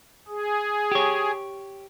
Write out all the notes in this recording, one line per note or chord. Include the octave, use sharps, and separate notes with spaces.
G#4
G4 C#5